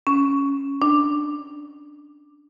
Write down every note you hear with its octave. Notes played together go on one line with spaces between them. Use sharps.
C#4
D4